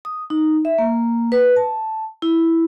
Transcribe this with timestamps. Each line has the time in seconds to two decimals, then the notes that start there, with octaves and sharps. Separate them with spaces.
0.05 D#6
0.30 D#4
0.65 E5
0.78 A#3
1.32 B4
1.56 A5
2.22 E4